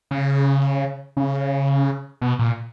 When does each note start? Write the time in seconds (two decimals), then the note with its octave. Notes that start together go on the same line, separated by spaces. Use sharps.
0.11 C#3
1.17 C#3
2.21 B2
2.39 A#2